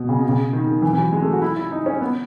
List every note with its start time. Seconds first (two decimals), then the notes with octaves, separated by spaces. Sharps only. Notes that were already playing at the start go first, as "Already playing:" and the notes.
Already playing: B2
0.09 C#3
0.19 B2
0.29 C#3
0.53 D#3
0.67 D#3
0.82 E3
0.93 E3
0.98 F#3
1.12 G#3
1.22 A3
1.32 F#4
1.42 E4
1.56 E4
1.71 D#4
1.86 C#4
2.01 B3